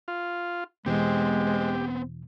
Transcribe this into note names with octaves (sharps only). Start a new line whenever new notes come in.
F4
E2 B2 E3 G#3 B3 C4 G4 C5